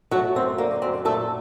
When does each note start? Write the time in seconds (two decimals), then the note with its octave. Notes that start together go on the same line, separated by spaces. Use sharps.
0.11 F#3 A3 F#4
0.35 F#2 C4
0.58 D3 A#3
0.82 F#2 C4
1.05 A#2 A3 A4